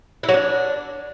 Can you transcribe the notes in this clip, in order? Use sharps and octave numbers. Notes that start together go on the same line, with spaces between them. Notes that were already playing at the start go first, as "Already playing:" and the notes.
E4
F#3
D4